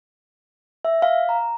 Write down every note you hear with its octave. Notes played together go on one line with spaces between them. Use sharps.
E5
F5
A#5